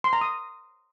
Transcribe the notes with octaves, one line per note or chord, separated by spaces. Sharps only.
C6
A#5
D#6